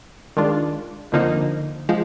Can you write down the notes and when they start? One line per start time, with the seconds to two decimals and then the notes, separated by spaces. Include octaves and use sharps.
0.37 D#3 G#3 D4 F4
1.12 F2 D3 F3 A#3 D#4
1.89 F3 G#3